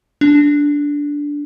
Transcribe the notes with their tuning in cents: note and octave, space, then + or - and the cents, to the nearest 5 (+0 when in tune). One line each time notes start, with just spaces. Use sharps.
D4 -10